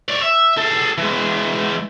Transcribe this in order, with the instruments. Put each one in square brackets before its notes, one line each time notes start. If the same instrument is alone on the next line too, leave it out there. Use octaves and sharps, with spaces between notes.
[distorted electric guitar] C#5 D5
E5
G#4 A4
E3 G#3